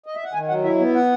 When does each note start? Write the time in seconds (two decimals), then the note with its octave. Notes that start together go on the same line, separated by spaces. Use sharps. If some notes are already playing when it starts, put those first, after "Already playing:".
0.06 D#5
0.15 E5
0.24 F#5
0.33 D#3 G#5
0.48 F#3 F#5
0.64 E4 E5
0.79 B3
0.94 F#5